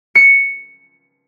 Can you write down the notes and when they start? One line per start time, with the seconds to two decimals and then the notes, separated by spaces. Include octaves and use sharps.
0.15 C#7